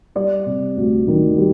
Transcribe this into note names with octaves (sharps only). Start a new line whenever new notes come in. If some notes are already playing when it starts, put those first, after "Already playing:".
G3 D5
C3
D2
D#3
G3